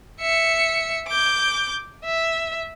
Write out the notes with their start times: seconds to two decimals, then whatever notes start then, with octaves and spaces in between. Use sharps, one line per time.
0.21 E5 C#7
1.08 D6 G6
2.05 E5